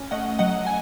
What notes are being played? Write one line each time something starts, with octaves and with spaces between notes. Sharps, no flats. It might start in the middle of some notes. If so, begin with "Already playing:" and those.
Already playing: C#4
A3 D#5 F#5
F#3 D#5 F#5
G#5